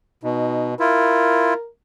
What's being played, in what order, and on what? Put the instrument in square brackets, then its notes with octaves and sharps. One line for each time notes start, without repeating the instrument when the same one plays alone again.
[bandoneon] B2 [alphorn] D#4
[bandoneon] E4 F4 [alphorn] A#4